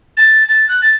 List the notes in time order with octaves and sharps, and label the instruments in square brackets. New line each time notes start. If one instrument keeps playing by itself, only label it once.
[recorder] A6
A6
F#6
A6